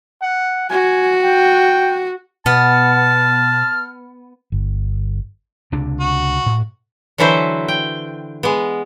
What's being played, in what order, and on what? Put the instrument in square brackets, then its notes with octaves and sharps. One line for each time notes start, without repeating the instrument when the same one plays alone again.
[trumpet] F#5
[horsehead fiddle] F#4 [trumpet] G#5
[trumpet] G5
[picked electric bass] B2 [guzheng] B3 [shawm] A5 [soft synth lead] F6
[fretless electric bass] G1
[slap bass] C#2 C3 D4
[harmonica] F#4
[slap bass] A2
[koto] D3 E3 F#3 E4 B4 C5
G5
G#3 B3